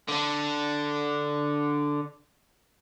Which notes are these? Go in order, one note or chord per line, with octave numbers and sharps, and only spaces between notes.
D3 D4